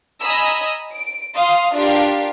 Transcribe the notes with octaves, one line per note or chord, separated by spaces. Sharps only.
D#5 G#5 A#5 B5 D#6 E6
D7
F5 C6 D#6
D4 F4 G4 A#4 F5